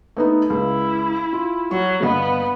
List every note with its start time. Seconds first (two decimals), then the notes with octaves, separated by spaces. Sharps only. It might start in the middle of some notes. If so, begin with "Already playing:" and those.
0.17 A3 B3 D#4
0.50 C#2 E4
1.33 F4
1.71 F#3 C#6
2.03 G1 B3 D#5 F5